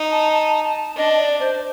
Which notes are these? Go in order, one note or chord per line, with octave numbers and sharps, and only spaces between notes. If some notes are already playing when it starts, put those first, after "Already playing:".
Already playing: D#4
A5
A5
A5
D4 D#5
D5
C5